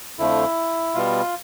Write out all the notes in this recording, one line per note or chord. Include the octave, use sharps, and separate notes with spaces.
F2 D3 F3 A3 E4
B2 G3 B3 F4